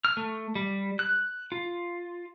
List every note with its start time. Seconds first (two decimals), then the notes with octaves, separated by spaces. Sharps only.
0.05 F6
0.17 A3
0.55 G3
0.99 F#6
1.52 F4